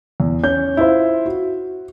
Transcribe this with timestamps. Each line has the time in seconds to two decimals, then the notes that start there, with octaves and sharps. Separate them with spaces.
0.20 E2
0.44 C#4 G6
0.77 E4 F4 C5
1.26 F#4